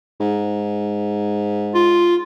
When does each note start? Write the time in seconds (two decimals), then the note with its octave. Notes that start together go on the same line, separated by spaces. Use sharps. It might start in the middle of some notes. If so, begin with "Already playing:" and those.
0.20 G#2
1.75 F4